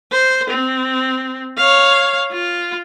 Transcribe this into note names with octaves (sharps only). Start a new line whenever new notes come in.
C5
C4
C#5 F5
F4